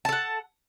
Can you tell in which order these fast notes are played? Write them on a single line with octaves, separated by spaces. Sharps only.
A5 A4 F#5